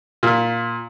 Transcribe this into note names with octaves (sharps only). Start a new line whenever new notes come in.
A#2